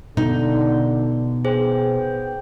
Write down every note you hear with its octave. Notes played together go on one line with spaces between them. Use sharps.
B2 D3 D#4
B3 G#4 C5 G5